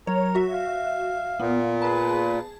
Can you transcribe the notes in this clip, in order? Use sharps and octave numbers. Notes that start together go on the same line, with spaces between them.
F#3 A#4 C#5
F#4 E5
F5
A#2 B3
G#4 B4 A5